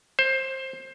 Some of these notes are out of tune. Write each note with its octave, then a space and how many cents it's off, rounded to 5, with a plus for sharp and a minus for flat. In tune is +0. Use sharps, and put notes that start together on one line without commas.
C5 +20